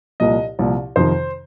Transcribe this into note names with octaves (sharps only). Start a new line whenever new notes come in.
C2 A#2 F3 D#5
C2 A#2 F3
F2 C3 D#3 C5